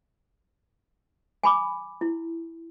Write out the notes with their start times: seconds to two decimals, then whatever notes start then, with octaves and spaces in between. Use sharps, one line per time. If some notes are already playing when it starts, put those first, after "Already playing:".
1.43 G#5 B5 D6
2.01 E4